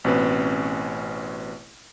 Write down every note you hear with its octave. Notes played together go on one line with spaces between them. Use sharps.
A1 B2 C4 C#4 B4